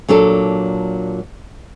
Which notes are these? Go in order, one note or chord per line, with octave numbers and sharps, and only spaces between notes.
A#2 F#3 D4 A4